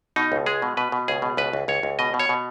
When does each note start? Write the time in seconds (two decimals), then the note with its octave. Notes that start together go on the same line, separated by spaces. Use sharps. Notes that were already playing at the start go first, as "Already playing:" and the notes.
0.16 B2 D#4
0.32 C#2
0.46 G#3 G#4
0.62 B2
0.77 B2 B4
0.92 B2
1.08 C#2 G#4
1.22 B2
1.37 C#2 B4
1.53 C#2
1.68 C#2 C#5
1.83 C#2
1.99 B2 D#5
2.14 B2
2.19 C#5
2.29 B2